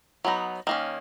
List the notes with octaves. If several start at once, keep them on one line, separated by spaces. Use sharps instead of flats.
F#3 B3 D#4
D#3 A#3 C#4